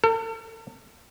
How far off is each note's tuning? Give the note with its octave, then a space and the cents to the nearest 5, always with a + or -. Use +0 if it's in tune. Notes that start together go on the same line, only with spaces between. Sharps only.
A4 +45